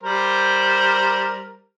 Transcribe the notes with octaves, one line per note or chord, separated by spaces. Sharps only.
G3 A#4 C5